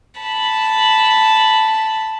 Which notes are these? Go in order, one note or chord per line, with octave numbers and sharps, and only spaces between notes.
A5 B5